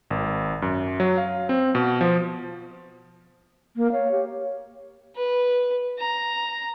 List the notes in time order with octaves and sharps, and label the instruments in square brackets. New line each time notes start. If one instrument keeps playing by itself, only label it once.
[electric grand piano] G#1
F#2
F#3
F5
C4
B2
F3
[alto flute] A#3
[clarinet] C#5 [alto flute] F5
[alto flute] G4
[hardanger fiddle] B4
A#5